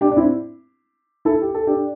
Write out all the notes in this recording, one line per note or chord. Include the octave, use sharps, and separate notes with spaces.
D4 G4
D4
C4 E4
E4 A4
G4
A4
D4 G4